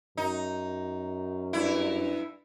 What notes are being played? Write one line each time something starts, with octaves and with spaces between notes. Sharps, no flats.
F#2 D#4
G2 E4